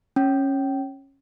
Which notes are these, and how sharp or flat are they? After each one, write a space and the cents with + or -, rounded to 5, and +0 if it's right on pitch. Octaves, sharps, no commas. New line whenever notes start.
C#4 -15